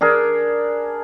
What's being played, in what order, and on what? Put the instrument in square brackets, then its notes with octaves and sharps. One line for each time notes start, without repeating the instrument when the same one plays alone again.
[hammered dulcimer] D4 G#4 A#4